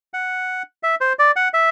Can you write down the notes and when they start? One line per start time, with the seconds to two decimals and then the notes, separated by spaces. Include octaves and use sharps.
0.14 F#5
0.83 E5
1.01 C5
1.19 D5
1.36 F#5
1.54 E5